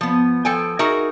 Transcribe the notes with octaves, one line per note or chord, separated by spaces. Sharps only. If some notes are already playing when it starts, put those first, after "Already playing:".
F3 B3
F3 A4 G5 G#5
D#4 F#4 G#4 A#4 E5